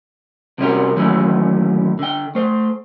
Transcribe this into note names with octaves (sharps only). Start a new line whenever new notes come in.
C2 C3 G3 C#4 F#4 A#4
A#2 D#3 E3 F#3 A3 C#4
D3 G5
A3 C5